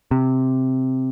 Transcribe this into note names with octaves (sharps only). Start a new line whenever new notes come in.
C3